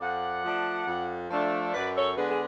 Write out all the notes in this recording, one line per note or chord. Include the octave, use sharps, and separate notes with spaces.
F2 D5 F#5
F3 A3 D4
F2
F3 A3 D4
F#2 B4 D5
A4 C#5
D3 G#3 B3 D4 G#4 B4
G#4